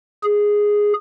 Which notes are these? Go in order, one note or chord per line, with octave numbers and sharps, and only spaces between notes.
G#4